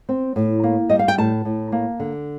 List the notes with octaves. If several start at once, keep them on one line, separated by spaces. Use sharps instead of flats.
C4
A2
A#3
G3 D#5
F5
G5
A2 A5
A2
A#3
D3